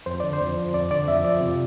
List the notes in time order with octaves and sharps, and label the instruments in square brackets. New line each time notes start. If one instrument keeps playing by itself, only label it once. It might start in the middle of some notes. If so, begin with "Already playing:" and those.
[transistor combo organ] F2 [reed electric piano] C5
[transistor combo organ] D3 [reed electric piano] D5
[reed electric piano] C5
[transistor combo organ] F2
F3
[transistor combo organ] F2 [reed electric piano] D5
[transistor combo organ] D3 [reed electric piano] D5
[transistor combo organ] F2 [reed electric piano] E5
[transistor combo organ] F3 [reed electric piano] D5
[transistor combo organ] C3 [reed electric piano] F4